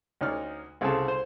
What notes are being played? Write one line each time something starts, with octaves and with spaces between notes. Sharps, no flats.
D2 C#4 D#4 D5 F6
C2 C#3 C4 G#4 A4 A5
C5